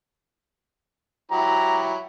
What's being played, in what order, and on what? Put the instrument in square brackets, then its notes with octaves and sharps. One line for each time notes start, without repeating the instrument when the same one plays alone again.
[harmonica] F#3 E4 G4 [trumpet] A#5